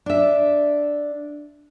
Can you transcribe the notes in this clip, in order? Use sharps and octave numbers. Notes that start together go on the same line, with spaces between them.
D4 E5